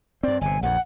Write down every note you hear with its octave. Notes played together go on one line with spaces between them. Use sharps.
G2 C4 D5
G1 C3 G#5
A#1 F2 F#5